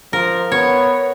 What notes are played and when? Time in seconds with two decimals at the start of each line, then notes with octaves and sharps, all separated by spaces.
0.13 F3 A#4
0.52 B3 C#5